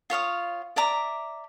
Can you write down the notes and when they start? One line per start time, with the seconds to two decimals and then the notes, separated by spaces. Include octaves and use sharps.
0.10 F4 C#5 F5 D#6
0.76 D5 E5 A#5 D6